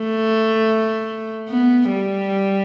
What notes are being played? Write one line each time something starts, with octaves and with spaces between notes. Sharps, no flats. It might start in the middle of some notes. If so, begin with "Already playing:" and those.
Already playing: A3
B3
G3